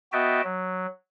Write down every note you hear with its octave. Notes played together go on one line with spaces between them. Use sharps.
B3 F#4 D#5 E5 G5 A5
F#3